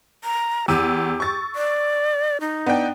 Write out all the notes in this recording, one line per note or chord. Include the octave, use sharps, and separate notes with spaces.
A#5
E2 G4 E6 D#7
C#6 A6
D5
D#4
B3 D4 G5